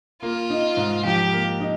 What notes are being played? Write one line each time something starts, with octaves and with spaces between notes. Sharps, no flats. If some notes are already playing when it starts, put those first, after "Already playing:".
A#3 F4
D#4
G#2
F3 G4
A#3
D#4